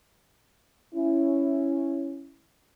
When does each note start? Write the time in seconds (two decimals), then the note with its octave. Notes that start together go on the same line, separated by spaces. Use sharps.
0.94 C#4 E4